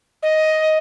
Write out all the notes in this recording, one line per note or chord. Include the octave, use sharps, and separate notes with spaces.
D#5